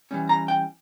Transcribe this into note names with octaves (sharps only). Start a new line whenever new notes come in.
E3 G3 C#4
A#5
G5